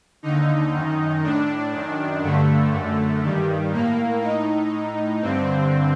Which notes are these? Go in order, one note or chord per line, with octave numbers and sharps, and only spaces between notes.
D#2 D3 D#4
F#2 D#3
A2 D4
F#2 D#3
G2 D3 A3
F#2 D3
G2 D#3 G3
A2 A#3
A2 D#4
A2
G2 D3 C4